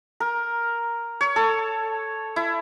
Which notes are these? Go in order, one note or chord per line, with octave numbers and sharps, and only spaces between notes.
A#4
C#5
A4
E4